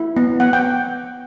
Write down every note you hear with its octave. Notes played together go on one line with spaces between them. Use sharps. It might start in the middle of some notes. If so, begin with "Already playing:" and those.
Already playing: E4
B3
B3 F#5
G5